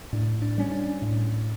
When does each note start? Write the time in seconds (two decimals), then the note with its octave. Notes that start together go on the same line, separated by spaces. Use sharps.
0.13 A2 D4
0.42 D4
0.58 G3 C#4
0.72 D4
1.02 A2